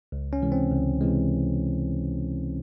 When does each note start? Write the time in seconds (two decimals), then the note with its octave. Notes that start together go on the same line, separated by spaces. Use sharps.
0.12 C#2
0.33 C#4
0.42 C3 E3 G#3
0.52 C4
0.71 C#2
1.01 C3 E3 G#3